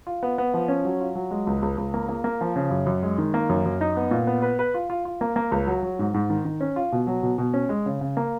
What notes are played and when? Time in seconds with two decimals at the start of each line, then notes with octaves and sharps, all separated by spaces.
0.07 F4
0.23 B3
0.38 B3
0.54 F3
0.68 C#4
0.85 F#3
1.00 F4
1.15 F#3
1.31 G#3
1.47 C#2
1.62 C#2
1.78 C#2
1.94 A#3
2.09 A#3
2.24 A#3
2.41 F3
2.56 C#3
2.71 F#2
2.87 F#2
3.03 G#3
3.18 D#3
3.34 A#3
3.49 F#2
3.65 F#2
3.81 D#4
3.97 B3
4.11 A#2
4.27 B3
4.42 B4
4.59 B4
4.74 F4
4.90 F4
5.05 F4
5.21 A#3
5.36 A#3
5.52 C#2
5.67 F#3
5.83 F#3
5.99 G#2
6.14 G#2
6.30 D#3
6.45 D#3
6.61 C#4
6.76 F4
6.92 B2
7.07 F#3
7.23 B2
7.38 B2
7.54 C#4
7.69 G#3
7.86 C#3
8.01 C#3
8.17 A#3